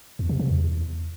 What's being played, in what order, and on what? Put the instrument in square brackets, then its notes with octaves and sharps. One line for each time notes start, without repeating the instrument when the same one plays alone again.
[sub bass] E2
C3
C3
E2